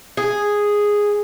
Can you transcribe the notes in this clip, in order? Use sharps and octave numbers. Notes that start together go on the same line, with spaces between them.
G#4